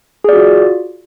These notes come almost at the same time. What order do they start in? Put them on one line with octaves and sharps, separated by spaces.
G#4 D5 F#4 F4